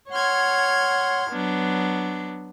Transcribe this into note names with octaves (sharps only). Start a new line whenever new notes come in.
C#5 F#5 C6 F6 G#6
F#3 B3 D4